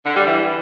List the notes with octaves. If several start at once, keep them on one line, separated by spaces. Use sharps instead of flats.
D3
G3
E3